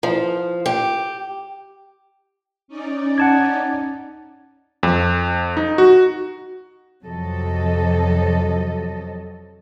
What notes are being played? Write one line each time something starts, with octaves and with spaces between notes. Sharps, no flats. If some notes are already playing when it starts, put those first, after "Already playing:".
F3
G4
C#4 D#4 D5
F#5 A5 G#6
F2
D#4
F#4
F2 C3 F3 F#3 A4 D#5